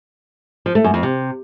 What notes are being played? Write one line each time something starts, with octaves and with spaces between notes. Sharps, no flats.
F3
A3
F#2
F2
C3